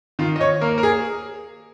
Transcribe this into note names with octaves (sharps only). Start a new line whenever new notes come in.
D#3 F4
D#5
C#5
A#3 A#4
A#4
G#4